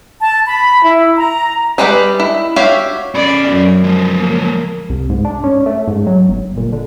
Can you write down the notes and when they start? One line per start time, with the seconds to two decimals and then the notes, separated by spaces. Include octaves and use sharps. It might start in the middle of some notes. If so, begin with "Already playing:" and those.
0.21 A5
0.46 B5
0.83 E4
1.17 A#5
1.78 G3 G#3 B4 D5 G5
2.20 E4
2.56 F#4 G4 C#5 E5 F5
3.15 C#4 D5 B5
3.48 F#2
3.84 F3 G#3
4.19 A#3
4.90 C2
5.10 G#2
5.25 D4
5.44 C#4
5.66 A3
5.88 G#2
6.07 F#3
6.29 G1
6.57 A#2
6.73 D3